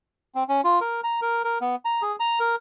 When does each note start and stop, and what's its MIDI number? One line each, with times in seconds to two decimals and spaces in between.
0.35 0.44 60
0.49 0.61 61
0.64 0.79 65
0.81 1.01 70
1.04 1.20 82
1.22 1.42 70
1.44 1.58 70
1.61 1.76 59
1.85 2.02 82
2.02 2.16 68
2.20 2.39 82
2.40 2.56 70